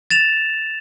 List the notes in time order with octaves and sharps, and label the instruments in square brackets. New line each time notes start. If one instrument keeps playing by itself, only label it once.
[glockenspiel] A6 E7 F7